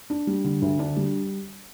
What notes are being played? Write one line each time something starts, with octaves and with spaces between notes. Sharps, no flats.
D4
G3
D3
D2
D4
G3